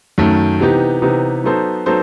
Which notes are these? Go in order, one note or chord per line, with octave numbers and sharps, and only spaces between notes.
F#2 D#3 A3
C3 E3 B3 D#4 G4
C3 E3 B3 D#4 G4
F#3 B3 D#4 A4 C5
F#3 B3 D#4 A4 C5